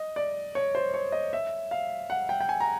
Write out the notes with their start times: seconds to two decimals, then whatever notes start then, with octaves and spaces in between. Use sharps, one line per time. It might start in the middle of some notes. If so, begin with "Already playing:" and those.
Already playing: D#5
0.16 D5
0.55 C#5
0.75 C5
0.94 C#5
1.12 D#5
1.33 E5
1.71 F5
2.10 F#5
2.29 G5
2.41 G5
2.49 G#5
2.60 A#5